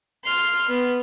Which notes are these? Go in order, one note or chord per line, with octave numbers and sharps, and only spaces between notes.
C6 F6
B3